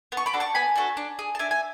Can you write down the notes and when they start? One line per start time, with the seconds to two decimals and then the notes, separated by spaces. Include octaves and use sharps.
0.12 B3
0.17 C#6
0.26 B5 D6
0.33 D4 F#4 A4
0.40 A5 C#6
0.55 B3 G#5 B5
0.76 D4 F#4 A4
0.97 D4
1.19 G#4
1.35 A5
1.39 D4 E5 G#5
1.51 G#5